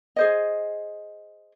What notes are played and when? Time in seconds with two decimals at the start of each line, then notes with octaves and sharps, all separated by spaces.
0.16 G#4 C5 D#5